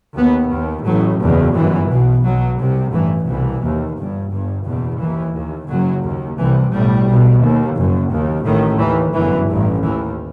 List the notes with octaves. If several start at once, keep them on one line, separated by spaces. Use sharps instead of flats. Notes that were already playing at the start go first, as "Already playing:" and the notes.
D#2 B3
D#2
A1 A2 F#3
F#1 E2 B2
G1 F#2 E3
B1 B2
B1 B2 F#3
C2 C3
A1 G2 E3
C2 B2 E3
D#2
G1 G2
G1 G2
F#1 E2 B2
D#2 E3
D#2
F#1 F#2 F#3
D#2
C2 C3 E3
B1 A2 G3
B1 B2
D#2
F#1 F#2
D#2
A1 A2 D#3
D#2 E3
G1 F#2 E3
A1 G2
D#2 E3